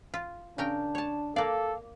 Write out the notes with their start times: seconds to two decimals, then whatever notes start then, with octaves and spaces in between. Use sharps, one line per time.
0.14 F4
0.58 C#3 D4 A#4 G5
0.95 C#5 A5
1.36 A#3 A4 D5 F5